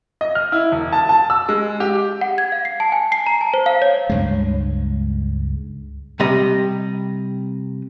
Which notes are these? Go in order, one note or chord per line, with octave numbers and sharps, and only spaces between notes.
D#5
F6
E4
E1
A5
A5
E6
G#3
G4
F#5
G#6
F5
C7
A5
G#5
C7
A#5
A5
C5
F5
C#5
C#2 G2 G#3
C3 G3 D#5